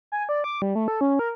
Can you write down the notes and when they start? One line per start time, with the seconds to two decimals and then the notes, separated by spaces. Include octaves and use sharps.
0.12 G#5
0.29 D5
0.44 D6
0.62 G3
0.75 A3
0.88 A4
1.01 C#4
1.19 A#4